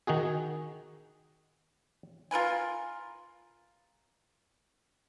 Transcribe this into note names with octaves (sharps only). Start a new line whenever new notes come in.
D#3 D#4 F#4 G#4
F4 A#4 B4 G#5